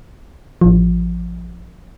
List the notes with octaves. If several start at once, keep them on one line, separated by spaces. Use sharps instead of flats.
A1 F3